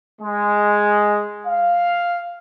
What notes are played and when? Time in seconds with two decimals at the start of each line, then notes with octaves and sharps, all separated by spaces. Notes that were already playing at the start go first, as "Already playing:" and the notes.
0.21 G#3
1.46 F5